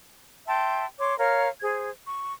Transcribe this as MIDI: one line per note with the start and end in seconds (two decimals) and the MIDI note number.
0.47 0.85 76
0.47 0.85 79
0.47 0.85 81
0.47 0.85 84
0.98 1.17 73
0.98 1.17 84
0.98 1.17 86
1.18 1.47 70
1.18 1.47 73
1.18 1.47 77
1.18 1.47 82
1.61 1.90 68
1.61 1.90 72
1.61 1.90 92
2.08 2.33 85